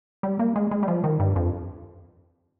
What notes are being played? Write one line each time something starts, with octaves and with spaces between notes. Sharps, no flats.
G3
A#3
G#3
G#3
G3
F3
D#3
G2
F2